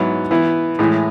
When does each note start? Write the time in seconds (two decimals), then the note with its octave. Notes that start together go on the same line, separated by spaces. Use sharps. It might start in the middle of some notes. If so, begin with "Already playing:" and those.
Already playing: G#2 F#3 B3 E4
0.31 E3 B3 E4
0.79 A2 E3 G#3